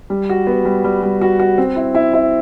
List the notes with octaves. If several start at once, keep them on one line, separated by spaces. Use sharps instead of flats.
G3
F#4
B3
G3
G3
G3
F#4
F#4
C4
E4
E4
E4